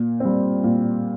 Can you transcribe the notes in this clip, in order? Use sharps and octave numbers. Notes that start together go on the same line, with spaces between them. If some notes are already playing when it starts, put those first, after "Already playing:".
Already playing: A#2
G3 C4
A#2